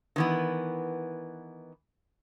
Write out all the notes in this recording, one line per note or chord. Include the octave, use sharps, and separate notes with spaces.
D#3 E3 B3